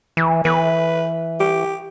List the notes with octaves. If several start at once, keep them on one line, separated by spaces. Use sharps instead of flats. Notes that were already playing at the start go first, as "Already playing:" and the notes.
E3
E3 B4
G4